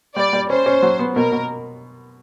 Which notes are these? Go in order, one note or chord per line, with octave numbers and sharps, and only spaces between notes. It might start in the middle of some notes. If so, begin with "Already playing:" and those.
G3 D5
G3
C#4 C5
C#4
F#3
B3
B2 A#4
B2